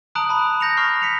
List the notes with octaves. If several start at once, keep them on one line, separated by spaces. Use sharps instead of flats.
A5 A#5 D#6 F#6 D7 F#7
A5 B5
G6 A#6 C#7 F7
C#6 F6 C7
B6 C#7 F7